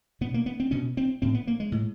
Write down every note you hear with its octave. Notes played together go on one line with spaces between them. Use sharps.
B2 B3
A#3
B3
C4
B2 C#4
C4
A2 C4
B3
A#3
G#3
A2